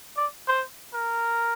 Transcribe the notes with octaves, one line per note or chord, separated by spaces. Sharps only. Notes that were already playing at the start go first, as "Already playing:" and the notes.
D5
C5
A#4